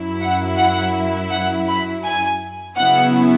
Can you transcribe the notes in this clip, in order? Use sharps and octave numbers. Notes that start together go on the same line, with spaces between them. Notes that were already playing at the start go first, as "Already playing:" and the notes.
Already playing: F#2 F#3 E4
F#5
F#5
F#5
B5
G#5
C#3 F#3 B3 E4 F#5